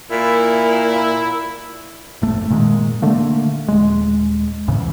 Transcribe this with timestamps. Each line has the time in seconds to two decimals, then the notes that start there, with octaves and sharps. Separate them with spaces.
0.11 A#2 E4
2.22 F#1 A3
2.50 A#2 D#3 G3 G#3
3.02 D3 A3 A#3
3.68 D#1 G#3
4.68 C2 G#2 C#3 E3